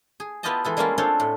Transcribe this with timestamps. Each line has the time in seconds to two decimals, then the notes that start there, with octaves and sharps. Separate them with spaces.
0.20 G#4
0.43 B3 E4 F4 G4 D#5 A5
0.64 E3 G#3 A4
0.77 G3 G#3 A#3 C#4 E4 F4
0.98 C4 D4 F4 A4 C5 C#5
1.20 A2